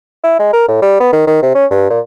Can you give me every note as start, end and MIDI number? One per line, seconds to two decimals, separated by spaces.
0.24 0.34 64
0.39 0.53 56
0.53 0.63 70
0.68 0.81 45
0.82 0.97 55
1.00 1.12 59
1.13 1.26 51
1.27 1.39 51
1.42 1.51 48
1.55 1.65 61
1.71 1.90 43
1.90 2.00 46